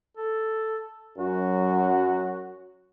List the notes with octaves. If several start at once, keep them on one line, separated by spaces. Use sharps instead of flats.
A4
F#2 F#3 F#4